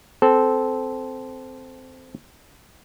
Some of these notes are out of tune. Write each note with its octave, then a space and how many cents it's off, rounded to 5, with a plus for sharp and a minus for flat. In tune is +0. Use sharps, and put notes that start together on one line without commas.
C4 -10 A4 -15